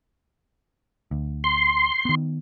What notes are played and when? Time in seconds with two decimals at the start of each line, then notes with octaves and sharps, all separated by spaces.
1.11 D2
1.44 C6
2.05 D#3 B3